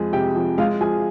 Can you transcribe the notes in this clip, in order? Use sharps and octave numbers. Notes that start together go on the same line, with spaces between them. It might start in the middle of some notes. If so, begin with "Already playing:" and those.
Already playing: F2 F3 G#3 G#4
C3 G4 G5
F3
G#3 F4 F5
F3 G#4 G#5